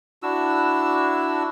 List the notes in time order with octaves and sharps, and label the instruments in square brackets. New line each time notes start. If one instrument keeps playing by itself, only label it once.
[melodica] D4 E4 F#4 E6